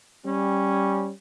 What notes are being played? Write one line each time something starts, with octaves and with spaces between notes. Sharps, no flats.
G3 C#4